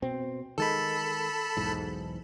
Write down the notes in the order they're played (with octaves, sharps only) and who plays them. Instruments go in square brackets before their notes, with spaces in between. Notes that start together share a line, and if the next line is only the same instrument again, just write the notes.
[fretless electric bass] B2 C4
[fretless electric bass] D#3 G#3 [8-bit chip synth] A4 A5 B5
[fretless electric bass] B1 E2 G#2